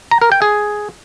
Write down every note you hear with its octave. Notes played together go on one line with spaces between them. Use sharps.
A#5
A#4
G5
G#4